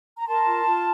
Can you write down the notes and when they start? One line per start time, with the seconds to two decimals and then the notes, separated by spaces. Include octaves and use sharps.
0.19 A#5
0.27 A#4 A5 C6
0.46 F4
0.65 F4